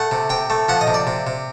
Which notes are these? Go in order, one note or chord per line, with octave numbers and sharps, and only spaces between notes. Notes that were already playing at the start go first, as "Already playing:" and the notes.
Already playing: A3 F#5
C3
C3 G5
A3
F3 F#5
D#5
C3
D5
C3
C3